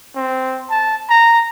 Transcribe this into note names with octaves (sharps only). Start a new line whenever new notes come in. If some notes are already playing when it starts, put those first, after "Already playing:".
C4
A5
A#5